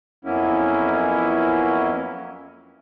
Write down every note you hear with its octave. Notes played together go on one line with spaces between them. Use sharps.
F2 F#3 A#3 B3 C#4 E4